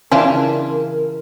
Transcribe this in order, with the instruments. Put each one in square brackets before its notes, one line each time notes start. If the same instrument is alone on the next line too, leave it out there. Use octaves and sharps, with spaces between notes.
[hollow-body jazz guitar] C#3 E3 E5 [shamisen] C#4 D4 F4 [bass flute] A#4